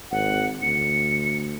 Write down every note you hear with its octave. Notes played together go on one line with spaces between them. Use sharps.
G#1 F#5
D2 C#7